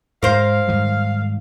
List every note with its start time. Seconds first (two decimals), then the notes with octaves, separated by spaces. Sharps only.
0.23 G#2 G#3 A#4 C5 F5
0.67 G#2 D#3 G3